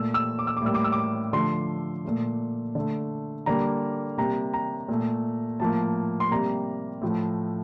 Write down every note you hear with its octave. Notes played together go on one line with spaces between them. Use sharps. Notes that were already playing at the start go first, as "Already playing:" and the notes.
Already playing: A#2 A3 E6
E6
D6
E6
D6
A2 G3 A#3 E6
D6
E6
D6
D3 F3 A3 C6
A#2 A3
D3 A3
D3 G3 A#3 A#5
C3 G3 A#3 A#5
A#5
A#2 A3
A2 F3 A#3 A5
C6
C3 G3 A#3 A#5
A2 F3 A3